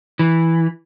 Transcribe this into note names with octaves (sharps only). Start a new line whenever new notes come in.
E3